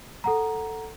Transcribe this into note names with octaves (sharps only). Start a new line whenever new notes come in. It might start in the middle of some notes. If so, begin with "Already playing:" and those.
A4 F#5 A#5